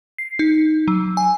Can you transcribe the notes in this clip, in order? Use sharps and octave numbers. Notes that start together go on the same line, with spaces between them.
C7
D#4
F#3
G#5